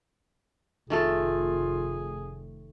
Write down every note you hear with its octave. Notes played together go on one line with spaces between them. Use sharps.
F1 D#3 A3 F4 G#4 A4